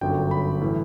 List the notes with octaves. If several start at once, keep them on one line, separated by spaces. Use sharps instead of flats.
G1 F#2 D3 F#3 G5
B5
A2 E3